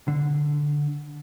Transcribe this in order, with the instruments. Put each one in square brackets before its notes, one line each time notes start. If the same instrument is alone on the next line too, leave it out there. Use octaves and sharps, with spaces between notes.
[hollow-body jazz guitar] D3